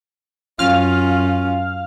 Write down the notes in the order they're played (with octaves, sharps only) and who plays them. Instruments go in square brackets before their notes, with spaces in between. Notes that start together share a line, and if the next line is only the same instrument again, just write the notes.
[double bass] F#2 C#4 [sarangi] F4 [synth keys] F5 F6